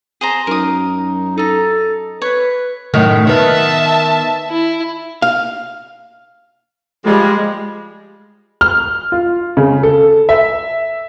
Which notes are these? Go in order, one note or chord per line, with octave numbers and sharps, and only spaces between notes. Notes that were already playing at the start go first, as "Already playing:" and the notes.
G#4 C5 A#5
F#2 D#4 A#4 D#6
D#4 A4 A#5
B4 C#5
F#2 A2 D#3
D#3 B3 E5 A5
E4
F5
F3 G3 G#3
F6
F4
C#3
A4
E5